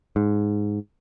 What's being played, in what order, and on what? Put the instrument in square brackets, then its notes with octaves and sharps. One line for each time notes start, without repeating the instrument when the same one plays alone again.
[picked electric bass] G#2